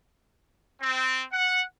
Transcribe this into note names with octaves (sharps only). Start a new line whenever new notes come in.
C4
F#5